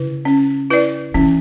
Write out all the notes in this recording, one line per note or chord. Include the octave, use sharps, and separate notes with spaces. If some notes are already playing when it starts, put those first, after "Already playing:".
Already playing: C#3 E4 B4
C#4
E4 B4 D5
E3 C#4